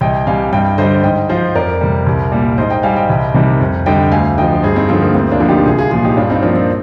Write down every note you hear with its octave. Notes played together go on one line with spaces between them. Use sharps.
C2 D#5 G5
C3 G3 F5 G#5
G2 D#5 G5
D3 G3 C5 D#5
G#2 D#5 G5
F3 C5 D#5
F2 A#4 D5
C3 G3
C2
A#2 G3
G#2 C5 D#5
D#5 G5
G3 F5 G#5
D#5 G5
C2
C3 D#3 G3
F2
D3 G3 D#5 G5
D2 F5 G#5
D3 F3 D#5 G5
G2 G#4 C5
C4 D#4
D3 F3 C4
A#3
D2 C4
A#3 D4
D3 F3
D#4 G4
C2 F4 G#4
F4 G#4
A#2 F3 F4 G#4
D#4 G4
G2 D4 F4
C4 D#4
F3 A#3 D4
C4